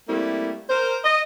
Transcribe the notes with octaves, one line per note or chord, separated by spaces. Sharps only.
G3 A3 A#3 C4 E4
A#4 C5
D#5